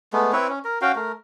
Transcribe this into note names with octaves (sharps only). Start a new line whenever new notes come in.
G#3 A3 B3
C4 E4 B4 C#5
C#4
A#4
C#4 F#4 F5 G5
A3 A#4